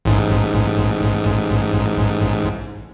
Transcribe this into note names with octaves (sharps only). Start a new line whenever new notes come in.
A1 G#2